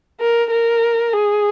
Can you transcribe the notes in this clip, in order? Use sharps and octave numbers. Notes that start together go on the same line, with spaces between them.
A#4
A#4
G#4